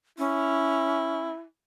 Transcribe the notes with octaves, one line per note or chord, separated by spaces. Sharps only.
C#4 E4